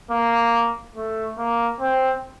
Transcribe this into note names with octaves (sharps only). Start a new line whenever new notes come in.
A#3
A3
A#3
C4